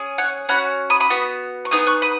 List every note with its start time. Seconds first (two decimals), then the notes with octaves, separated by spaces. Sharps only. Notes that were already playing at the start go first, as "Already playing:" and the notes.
Already playing: C#4 G#4
0.18 C#5 F#5
0.49 C#4 F#4 F#5 B5
0.90 B5 D#6
1.00 B5 D#6
1.10 B3 F#4
1.65 C#6
1.71 B3 D#4 G#4 D#6
1.87 C#6 F#6
2.02 B5 D#6